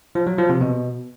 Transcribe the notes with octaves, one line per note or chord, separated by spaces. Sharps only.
F3
F#3
F3
C3
B2